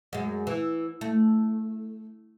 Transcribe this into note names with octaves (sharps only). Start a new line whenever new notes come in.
F#2 G#3
E3
A3